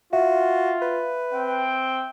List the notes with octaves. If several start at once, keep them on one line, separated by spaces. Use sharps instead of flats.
F4 F#4 E5
B4
C4 G5